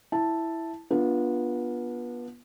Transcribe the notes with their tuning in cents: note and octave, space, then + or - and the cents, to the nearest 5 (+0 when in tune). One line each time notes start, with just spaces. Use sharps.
E4 +0 A5 +0
B3 -25 D4 +0 F4 +0